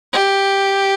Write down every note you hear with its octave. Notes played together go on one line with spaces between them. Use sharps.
G4